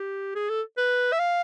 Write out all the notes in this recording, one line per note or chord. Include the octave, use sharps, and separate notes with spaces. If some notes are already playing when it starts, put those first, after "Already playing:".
Already playing: G4
G#4
A4
B4
E5
F5